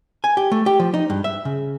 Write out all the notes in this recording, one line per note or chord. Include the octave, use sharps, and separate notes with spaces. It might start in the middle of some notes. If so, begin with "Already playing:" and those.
G#5
G4
A3
G4
F3
D#4
G2
E5
C#3